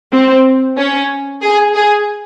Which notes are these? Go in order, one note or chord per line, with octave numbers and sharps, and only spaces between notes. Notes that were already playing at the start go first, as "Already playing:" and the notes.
C4
C#4
G#4
G#4